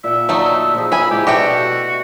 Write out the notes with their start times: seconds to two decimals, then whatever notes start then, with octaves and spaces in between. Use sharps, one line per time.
0.04 A#2 E5 F#5 G5
0.29 D3 F#3 A3 D#4
0.75 F3 D#4 G#4
0.92 E5 G#5 B5
1.11 A2 C3 G#3 G4
1.27 B2 A3 D4 F#4 G4 E5 G5